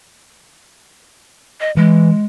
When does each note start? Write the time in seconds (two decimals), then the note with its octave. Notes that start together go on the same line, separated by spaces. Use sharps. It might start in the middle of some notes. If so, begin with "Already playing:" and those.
1.61 D#5
1.77 E3 G#3